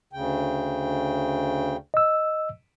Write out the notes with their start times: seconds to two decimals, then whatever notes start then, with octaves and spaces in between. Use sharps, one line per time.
0.13 D2 C#3 G5
1.94 D#5 E6